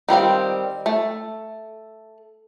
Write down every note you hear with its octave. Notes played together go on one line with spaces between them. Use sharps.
D#3 G3 C4 F5
A3